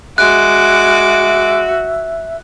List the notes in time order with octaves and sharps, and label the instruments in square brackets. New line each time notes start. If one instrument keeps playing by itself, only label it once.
[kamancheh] G#3 D6 [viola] F#4 [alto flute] E5 [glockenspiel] F#6